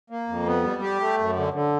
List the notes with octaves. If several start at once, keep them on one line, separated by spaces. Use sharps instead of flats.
A#3
F2
B3
G3
G4
A3
F#2
D3
D3